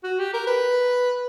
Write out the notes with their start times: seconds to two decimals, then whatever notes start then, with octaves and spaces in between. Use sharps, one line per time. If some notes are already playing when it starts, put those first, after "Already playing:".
0.03 F#4
0.19 G4
0.34 A#4
0.47 B4